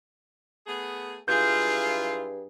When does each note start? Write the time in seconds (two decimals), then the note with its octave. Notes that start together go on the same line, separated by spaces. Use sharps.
0.67 A3 B3 G#4
1.28 G2 F#3 E4 F4 G#4 G6